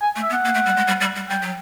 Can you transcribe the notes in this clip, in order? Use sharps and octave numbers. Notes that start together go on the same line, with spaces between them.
G#5
A3
E5
B3
F#5
A#3
A3
G3
G#3
G3
G3
G3
G3 G5
F#3